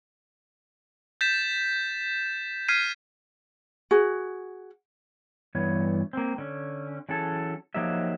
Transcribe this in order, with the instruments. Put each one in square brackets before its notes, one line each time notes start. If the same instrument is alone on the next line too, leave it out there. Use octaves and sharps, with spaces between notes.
[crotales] G6 A6 B6 E7
F6 G#6 B6 C7 D#7
[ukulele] F#4 G#4
[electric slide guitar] G2 E3 B3 C#5
A#3 C4
D3 C#4
E3 F#3 C#4 G#4 A4
F3 F#3 A#3 D#4 G4 E5